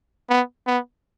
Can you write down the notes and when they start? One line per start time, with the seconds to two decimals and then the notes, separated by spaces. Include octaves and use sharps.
0.30 B3
0.67 B3